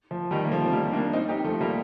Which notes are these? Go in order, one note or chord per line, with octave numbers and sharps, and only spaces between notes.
F3
D#3 G3
A#3
F3 A3
C4
G3 A#3
A#3 D4
C4 D#4
D#4 G4
F3 A3
G3 A#3